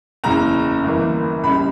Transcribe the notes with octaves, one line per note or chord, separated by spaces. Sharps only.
F#1 E2 C#3 A#5
G1 F#2 E3 A#3
C#2 C#3 G3 B5